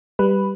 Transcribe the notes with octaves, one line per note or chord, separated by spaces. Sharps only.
G3 B4